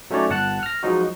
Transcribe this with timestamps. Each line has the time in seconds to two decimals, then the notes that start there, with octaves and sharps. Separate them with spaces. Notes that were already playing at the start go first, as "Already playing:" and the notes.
0.10 F#3 A3 C#4 D#4 C#5 D5
0.30 G1 F#5 A5 F#6
0.63 F6 A#6
0.83 F3 F#3 G#3 D#4 F#4